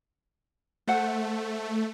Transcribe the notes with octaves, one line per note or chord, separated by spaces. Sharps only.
A3 C5 F#5